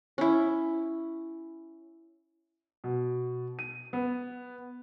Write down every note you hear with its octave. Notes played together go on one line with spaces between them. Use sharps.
C#4 E4
B2
D#7
B3